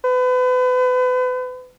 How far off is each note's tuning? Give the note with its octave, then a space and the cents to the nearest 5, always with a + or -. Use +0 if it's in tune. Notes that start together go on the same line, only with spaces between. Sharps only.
B4 +35